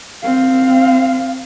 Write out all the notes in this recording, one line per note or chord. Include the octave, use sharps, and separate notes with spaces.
C4 F5